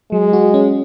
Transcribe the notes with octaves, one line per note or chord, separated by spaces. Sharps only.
F#3 G#3
F#4
C#4